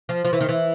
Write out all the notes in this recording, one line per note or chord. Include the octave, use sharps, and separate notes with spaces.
F3
F3
E3
D#3
E3